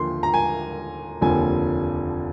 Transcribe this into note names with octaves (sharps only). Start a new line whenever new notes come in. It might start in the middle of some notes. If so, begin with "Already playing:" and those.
Already playing: D#2 D3 F3 C6
A#5
G#5
F1 D#2 D3 F3 G#5